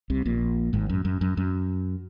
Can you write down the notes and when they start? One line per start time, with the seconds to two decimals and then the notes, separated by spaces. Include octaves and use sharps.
0.10 C2 C3
0.25 A#1 A#2
0.73 G#1 G#2
0.90 F#2
1.05 F#2
1.21 F#2
1.37 F#2